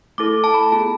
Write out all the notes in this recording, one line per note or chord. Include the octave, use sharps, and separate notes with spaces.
A3 E4 A4 D6
A5
B5
B3 F4 G#4 A5